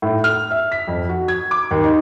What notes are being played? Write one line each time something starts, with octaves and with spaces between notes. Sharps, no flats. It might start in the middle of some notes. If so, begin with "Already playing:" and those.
A2
F6
E5
B6
F2
F#4
G#6
D6
D#2
D#4